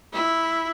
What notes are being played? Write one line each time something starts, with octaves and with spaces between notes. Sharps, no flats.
E4